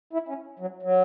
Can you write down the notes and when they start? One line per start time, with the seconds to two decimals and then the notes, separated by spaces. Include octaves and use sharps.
0.13 E4
0.29 C#4
0.59 F#3
0.82 F#3